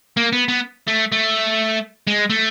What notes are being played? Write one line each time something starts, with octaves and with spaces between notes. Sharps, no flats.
A#3
B3
B3
A3
A3
G#3
A3